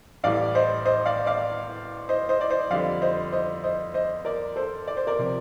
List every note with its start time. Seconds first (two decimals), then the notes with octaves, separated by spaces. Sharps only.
0.24 A1 A2 G3 D5 F5
0.55 C5 D#5
0.86 C5 D#5
1.06 D5 F5
1.26 D5 F5
2.09 C5 D#5
2.29 C5 D#5
2.41 D5
2.50 C5 D#5
2.70 F2 D3 G3 D5 F5
3.02 C5 D#5
3.33 C5 D#5
3.64 C5 D#5
3.94 C5 D#5
4.25 A#4 D5
4.56 A4 C5
4.88 D5
4.97 C5
5.07 A#4 D5
5.19 C3 F3